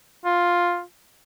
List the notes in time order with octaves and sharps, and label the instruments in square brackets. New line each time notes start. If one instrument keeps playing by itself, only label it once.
[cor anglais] F4